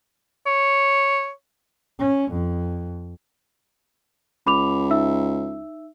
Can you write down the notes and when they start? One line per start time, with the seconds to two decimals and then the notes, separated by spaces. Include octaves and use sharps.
0.46 C#5
1.99 C#4
2.32 F2
4.47 C#2 B5 D6 F7
4.90 D#4 E5 E6